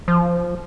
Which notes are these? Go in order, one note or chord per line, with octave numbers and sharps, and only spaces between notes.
F3